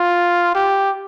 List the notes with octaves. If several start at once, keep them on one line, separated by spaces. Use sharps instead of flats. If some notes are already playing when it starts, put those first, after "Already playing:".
Already playing: F4
G4